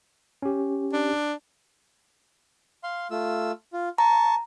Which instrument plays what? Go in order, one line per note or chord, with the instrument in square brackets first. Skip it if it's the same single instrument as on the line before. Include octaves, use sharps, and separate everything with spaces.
[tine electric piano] C#4 G4
[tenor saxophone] D4
[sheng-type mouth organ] F5 C6
A3 F4 E6
F4
[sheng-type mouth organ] A5 C#6 [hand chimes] A#5